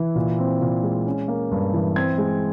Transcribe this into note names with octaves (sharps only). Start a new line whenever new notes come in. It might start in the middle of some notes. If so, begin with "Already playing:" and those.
Already playing: E3
A#2
C4
A#2
G#3
C#4
A#3
G2
E3
C4 G#6
G#3